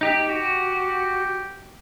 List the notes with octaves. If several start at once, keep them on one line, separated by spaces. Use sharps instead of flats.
D#4 G4
F#4 G4